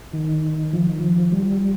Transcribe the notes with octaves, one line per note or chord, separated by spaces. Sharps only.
D#3
F3
D#3
F3
G3